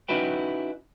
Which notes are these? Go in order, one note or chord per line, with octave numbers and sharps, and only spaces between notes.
C#4 D#4 E4 F#4 B4 G5